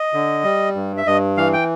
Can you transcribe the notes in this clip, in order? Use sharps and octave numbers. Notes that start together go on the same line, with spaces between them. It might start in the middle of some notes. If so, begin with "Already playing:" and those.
Already playing: D#5
D3
G3
G2
E5
G2 D#5
E3 F5
G5